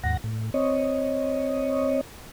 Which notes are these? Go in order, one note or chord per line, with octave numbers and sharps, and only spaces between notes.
D#2 G#2 F#5 A#6
A2
C4 C#5 D#5